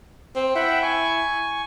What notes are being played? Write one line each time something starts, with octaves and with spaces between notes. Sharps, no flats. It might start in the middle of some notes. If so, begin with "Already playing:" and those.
C4
E4 E5 F#5 G5
G#5 C#6